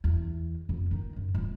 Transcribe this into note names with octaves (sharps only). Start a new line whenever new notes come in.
E2
F2
D#3 D#4
F#2
D#1 A#1